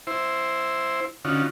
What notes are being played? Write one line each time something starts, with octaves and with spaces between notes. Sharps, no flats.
E4 C5
D3 C#4 D#4 F4 F#4